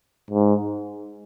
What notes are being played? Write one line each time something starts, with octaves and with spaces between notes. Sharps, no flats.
G#2